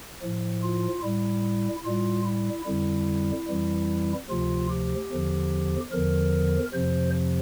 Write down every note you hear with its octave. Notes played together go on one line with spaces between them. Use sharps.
A2 F3
F4
A2 G3 E4
A2 G3 F4
E4
F2 D3 G3 E4
F2 E3 G3
D2 C3 F3 F4
G4
E2 D3 F3
E2 D3 F3 A#4
F2 C3 F3 C5